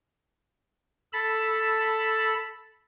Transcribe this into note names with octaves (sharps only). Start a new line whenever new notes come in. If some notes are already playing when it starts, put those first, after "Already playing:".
A4 A5 B5